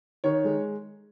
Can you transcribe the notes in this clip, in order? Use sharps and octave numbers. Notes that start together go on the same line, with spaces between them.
D#3 C#5
G#3